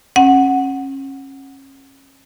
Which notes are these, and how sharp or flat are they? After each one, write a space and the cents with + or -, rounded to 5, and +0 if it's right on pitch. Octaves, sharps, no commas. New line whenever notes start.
C#4 -30 F#5 +0